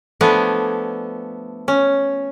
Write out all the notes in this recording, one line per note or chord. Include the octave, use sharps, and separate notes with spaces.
F3 A3 B3 D4 G#5
C#4